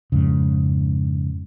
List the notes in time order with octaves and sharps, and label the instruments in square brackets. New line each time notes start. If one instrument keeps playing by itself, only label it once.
[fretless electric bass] F2 G#2 C#3